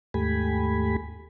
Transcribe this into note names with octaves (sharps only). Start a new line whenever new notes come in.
D#2 G#2 A3 G4 G#5 B5